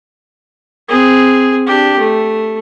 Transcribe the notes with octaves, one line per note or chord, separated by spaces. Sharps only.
C4 G#4
D4 G4
A3